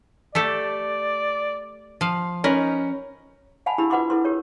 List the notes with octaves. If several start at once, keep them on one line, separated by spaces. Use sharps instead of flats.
A3 G4 A4 D5
F3 F5
C#4 D#4 A#4 B4
F5 F#5 G#5 A5 B5
D4 E4 G4 B5 E6
F4 B4 F#5 B5 C6 D6
E4 A4 B4 C6
G4 A#4 C#5